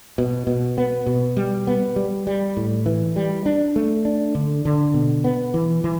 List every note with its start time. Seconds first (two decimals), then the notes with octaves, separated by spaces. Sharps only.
0.18 B2
0.47 B2
0.78 B3
1.06 B2
1.37 G3
1.67 B3
1.96 G3
2.27 G3
2.57 A2
2.86 E3
3.16 G3
3.46 D4
3.76 A3
4.05 D4
4.35 D3
4.65 D3
4.94 B2
5.24 B3
5.54 E3
5.84 E3